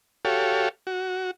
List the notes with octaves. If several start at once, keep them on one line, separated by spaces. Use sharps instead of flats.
F#4 G4 A4 C#5 F5
F#4